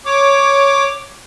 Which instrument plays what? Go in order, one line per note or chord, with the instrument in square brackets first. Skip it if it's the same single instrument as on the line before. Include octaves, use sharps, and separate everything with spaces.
[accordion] C#5 D6